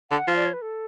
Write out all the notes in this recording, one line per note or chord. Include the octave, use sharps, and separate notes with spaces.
D3 F#5
F3 F5
D5
C#5
B4
A4